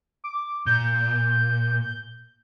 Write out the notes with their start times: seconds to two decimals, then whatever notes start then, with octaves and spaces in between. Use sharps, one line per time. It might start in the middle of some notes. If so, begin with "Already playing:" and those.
0.24 D6
0.66 A#2 G6